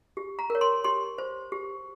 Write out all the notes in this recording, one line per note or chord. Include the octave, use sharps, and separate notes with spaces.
G4
A#5
A#4 C#5
C6
G4 C6
C5
G4